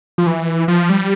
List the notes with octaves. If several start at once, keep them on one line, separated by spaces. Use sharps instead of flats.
F3
E3
F3
G3